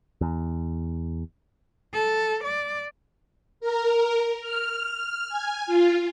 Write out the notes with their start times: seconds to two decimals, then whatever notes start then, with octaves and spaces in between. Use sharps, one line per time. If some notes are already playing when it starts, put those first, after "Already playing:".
0.21 E2
1.93 A4
2.42 D5
3.60 A#4
4.40 F6
5.28 G#5
5.66 F4